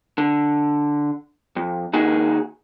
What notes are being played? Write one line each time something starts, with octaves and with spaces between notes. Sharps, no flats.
D3
F2
D#2 A#3 D#4 F#4 G#4